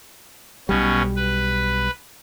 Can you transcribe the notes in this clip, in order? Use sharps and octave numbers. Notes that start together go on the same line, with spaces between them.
B1 B2 G3 C#4
B4